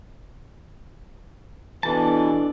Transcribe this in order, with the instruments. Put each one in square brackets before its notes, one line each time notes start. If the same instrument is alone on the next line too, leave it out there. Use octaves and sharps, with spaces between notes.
[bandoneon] B2 E3 [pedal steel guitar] D4 A4 A5